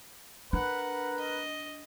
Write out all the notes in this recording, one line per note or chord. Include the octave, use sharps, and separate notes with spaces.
D4 A#4 B4 F#5
D#5